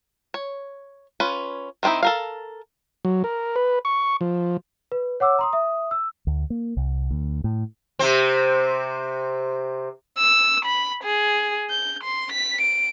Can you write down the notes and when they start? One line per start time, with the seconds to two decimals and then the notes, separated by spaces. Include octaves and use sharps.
0.34 C#5
1.20 C#4 F4 B4
1.83 D#3 C4 C#4 D#4 E4
2.03 A4 A#4 F5
3.05 F#3
3.24 A#4
3.56 B4
3.85 C#6
4.21 F3
4.92 B4
5.20 C#5 F#5 D6 E6
5.39 A#5 C6 D#6
5.53 E5 D#6
5.91 E6
6.27 D2
6.50 A#3
6.77 C2
7.11 D2
7.44 A2
7.99 C3 C4
10.18 E6
10.65 B5
11.04 G#4
11.71 G6
12.04 C6
12.33 B6
12.62 D7